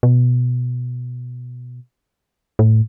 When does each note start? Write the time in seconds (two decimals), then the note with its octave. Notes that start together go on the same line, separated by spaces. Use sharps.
0.03 B2
2.59 A2